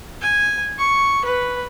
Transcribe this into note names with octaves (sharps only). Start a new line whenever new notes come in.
G#5
C#6
B4